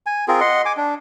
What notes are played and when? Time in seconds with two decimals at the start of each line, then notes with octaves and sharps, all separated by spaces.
0.06 G#5
0.28 C4 F4 G#4 A#4
0.40 D#5 F#5 C6
0.65 G#5 D6
0.77 D4